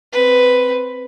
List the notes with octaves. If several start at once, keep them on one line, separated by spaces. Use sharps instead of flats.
C4 B4